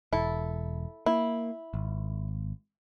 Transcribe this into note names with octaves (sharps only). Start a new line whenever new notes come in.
E1 E4 A4
A#3 E4
G#1